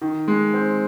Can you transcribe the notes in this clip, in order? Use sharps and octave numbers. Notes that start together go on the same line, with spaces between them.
D#3
G#3
C4